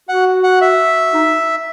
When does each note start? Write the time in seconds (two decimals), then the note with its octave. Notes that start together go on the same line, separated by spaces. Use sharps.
0.09 F#4 F#5
0.44 F#5
0.61 E5
1.14 D#4